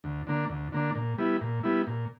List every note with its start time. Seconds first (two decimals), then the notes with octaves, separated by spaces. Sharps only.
0.04 D2
0.27 D3 A#3 D4
0.50 D2
0.72 D3 A#3 D4
0.95 A#2
1.18 G3 B3 E4
1.41 A#2
1.63 G3 B3 E4
1.87 A#2